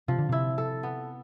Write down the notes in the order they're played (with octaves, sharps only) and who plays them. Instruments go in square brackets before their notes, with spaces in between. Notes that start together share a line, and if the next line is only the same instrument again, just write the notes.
[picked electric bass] C3 [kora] F3
[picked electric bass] D3
[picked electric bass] C3 [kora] E4
[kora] A4
B3